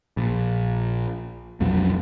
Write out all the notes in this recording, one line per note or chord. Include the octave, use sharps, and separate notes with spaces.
A#1
F1 B1 F2 F#3